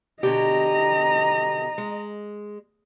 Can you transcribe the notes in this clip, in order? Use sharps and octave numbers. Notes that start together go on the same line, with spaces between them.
B2 D3 G4 D#5 A#5
G#3